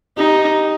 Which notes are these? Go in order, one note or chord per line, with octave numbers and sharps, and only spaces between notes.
D#4 G4